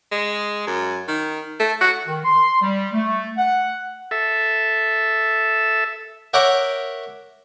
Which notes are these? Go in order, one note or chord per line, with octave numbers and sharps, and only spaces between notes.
G#3
F#2
D#3
A3
F#4
D#3
C6
G3
A3
F#5
A4 E5
A#4 C#5 E5 F#5 G5 D6